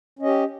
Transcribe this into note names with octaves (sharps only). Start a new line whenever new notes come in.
C#4 G4 D#5